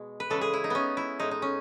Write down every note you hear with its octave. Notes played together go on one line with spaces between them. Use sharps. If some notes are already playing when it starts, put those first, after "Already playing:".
Already playing: B2 G#3
B4
C#3 E3 G#3 A4
G#4
E4
D#4
B3 C#4
E4
A2 G#3 D#4
D#4
C#4